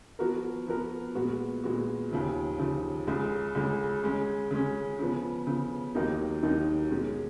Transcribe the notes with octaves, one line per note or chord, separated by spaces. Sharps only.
F3 B3 F#4 A#4
F3 B3 F#4 A#4
A#2 G#3 B3 F#4
A#2 G#3 B3 F#4
D#2 C#3 F3
D#2 C#3 F3
C#2 C#3 G#3
C#2 C#3 G#3
C#3 G#3 C#4
C#3 G#3 C#4
C#3 F3 B3
C#3 F3 B3
D#2 D#3 F#3 A#3 D#4
D#2 D#3 F#3 A#3 D#4
B2 G#3 C#4